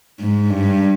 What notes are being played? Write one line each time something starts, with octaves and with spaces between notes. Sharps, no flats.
G#2
G2